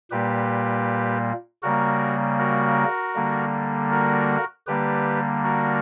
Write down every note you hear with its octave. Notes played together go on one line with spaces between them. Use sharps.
A#2 G3 A#3 G4 B4
C#3 G3 A#3 F#4 A#4
F#4 A#4
D3 G3 A#3
F#4 A#4
D3 G3 A#3 G4 B4
F#4 A#4